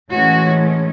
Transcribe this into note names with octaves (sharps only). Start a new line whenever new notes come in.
A2 E3 G#3 C#4 F#4